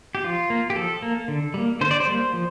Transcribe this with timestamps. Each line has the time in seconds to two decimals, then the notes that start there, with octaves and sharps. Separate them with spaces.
0.15 G4
0.24 F3 F4
0.50 A#3
0.70 G4
0.76 F3 A4
1.02 A#3
1.28 D3
1.54 G3 A#3
1.81 D3 C5
1.91 D5
2.00 C5
2.07 G3 A#3
2.33 F3